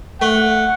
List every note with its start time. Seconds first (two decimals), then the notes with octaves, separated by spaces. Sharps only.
0.21 A3 F#5